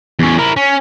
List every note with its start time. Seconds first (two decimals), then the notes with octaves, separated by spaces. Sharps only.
0.19 E2 C#4
0.38 E4 A#4
0.57 C#4